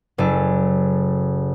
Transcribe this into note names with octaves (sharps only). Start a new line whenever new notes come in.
F#1 A4